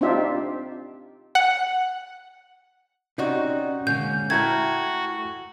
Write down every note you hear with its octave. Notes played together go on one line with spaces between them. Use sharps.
C4 D4 D#4 F4 G4 E5
F#5
C3 C#4 D#4 F#4 D5
A#2 D3 G#3 A#3 C#4 G6
A3 E4 F#4 A#4 G5 A#5 G#6